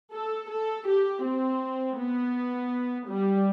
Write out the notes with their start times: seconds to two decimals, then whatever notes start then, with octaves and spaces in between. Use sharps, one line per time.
0.13 A4
0.49 A4
0.87 G4
1.24 C4
1.97 B3
3.08 G3